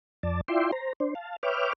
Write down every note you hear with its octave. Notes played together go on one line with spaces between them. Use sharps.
F2 D5 A5
E4 F4 D5 E5 G5 C6
C5 A#5
D4 C5
F5 A5
B4 C#5 E5 G5 D6 F6